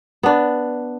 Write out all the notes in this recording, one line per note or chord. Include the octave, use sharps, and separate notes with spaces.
B3 D4